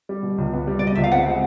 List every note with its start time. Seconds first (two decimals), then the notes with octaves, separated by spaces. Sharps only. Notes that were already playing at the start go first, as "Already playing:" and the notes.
0.09 G3
0.23 B2
0.38 C#2
0.53 B3
0.67 G3
0.79 D5
0.82 B2 D#5
0.95 C#2 E5
1.04 F5
1.12 C4 F#5
1.26 G#3